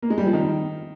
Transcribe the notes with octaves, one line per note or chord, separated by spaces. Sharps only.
A#3
G#3
G3
F3
D#3